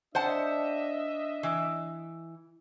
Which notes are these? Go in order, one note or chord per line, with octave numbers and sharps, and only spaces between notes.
D4 C5 D#5 E5 F#5 A5
E3